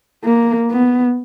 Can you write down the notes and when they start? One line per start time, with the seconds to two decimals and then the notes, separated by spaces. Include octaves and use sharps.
0.25 A#3
0.71 B3